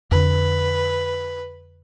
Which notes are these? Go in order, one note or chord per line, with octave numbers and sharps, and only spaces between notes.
F2 D3 B4